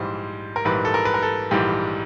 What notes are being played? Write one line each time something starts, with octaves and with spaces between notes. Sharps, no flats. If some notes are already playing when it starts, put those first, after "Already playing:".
Already playing: A#1 G#2 E3 G3 C5
A#4
A#1 G#2 E3 G3 B4
A4
A#4
B4
A#4
A4
A#1 G#2 E3 G3 G4